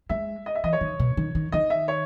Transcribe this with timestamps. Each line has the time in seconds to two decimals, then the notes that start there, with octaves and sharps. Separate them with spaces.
0.09 G#3 E5
0.46 D#5
0.55 E5
0.64 E3 D#5
0.73 C#5
0.81 D#3
1.00 B2
1.17 D#3
1.35 D#3
1.52 D#3 D#5
1.70 E5
1.88 C#5